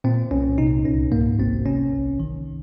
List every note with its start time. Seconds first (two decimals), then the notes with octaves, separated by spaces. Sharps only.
0.04 A#2 C4
0.31 C2 C#4
0.58 C3 D#4
0.84 C#2 C#4
1.12 G#2 A#3
1.39 G#1 C4
1.66 C3 C#4
1.93 C2
2.20 D#3